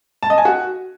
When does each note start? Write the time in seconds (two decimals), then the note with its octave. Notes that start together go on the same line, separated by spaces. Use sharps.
0.23 A5
0.30 D#5
0.38 G#5
0.45 F#4